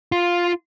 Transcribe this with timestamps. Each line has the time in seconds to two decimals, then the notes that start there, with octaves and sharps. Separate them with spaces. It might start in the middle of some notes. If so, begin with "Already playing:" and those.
0.12 F4